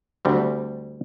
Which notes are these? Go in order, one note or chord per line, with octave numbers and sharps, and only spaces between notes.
D2 G3 C4